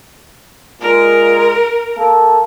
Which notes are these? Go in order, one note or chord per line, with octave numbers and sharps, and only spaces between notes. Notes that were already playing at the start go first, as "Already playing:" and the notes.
A#2 G#3 A#4
A#3 A4